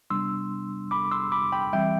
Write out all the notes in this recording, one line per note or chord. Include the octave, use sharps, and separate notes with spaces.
C3 G3 B3 D4 C6 E6
B5 D6
C6 E6
B5 D6
G5 B5
E3 G3 C4 E5 G5